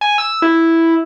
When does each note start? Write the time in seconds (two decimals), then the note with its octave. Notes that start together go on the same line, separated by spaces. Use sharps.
0.01 G#5
0.18 E6
0.42 E4